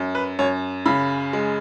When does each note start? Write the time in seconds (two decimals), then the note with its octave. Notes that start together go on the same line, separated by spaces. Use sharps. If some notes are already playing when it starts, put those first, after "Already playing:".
Already playing: F#2
0.15 B4
0.39 F#2 C#5
0.86 C#3 B5
1.33 G#3